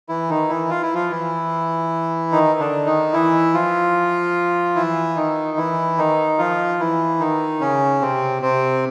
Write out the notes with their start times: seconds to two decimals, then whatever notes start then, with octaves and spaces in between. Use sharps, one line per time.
0.09 E3 E4
0.29 D#3 D#4
0.49 E3 E4
0.70 F4
0.82 E4
0.95 F3 F4
1.10 E3 E4
2.32 D#3 D#4
2.59 D3 D4
2.86 D#3 D#4
3.13 E3 E4
3.54 F3 F4
4.76 E3 E4
5.16 D#3 D#4
5.57 E3 E4
5.98 D#3 D#4
6.38 F3 F4
6.80 E3 E4
7.20 D#3 D#4
7.61 C#3 C#4
8.01 C3 C4
8.42 C3 C4